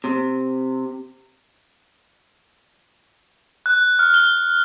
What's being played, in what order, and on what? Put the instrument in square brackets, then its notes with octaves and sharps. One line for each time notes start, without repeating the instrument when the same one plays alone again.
[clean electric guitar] C3
[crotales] F#6
F6
G7